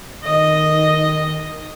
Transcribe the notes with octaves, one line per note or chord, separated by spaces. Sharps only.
D#3 D#5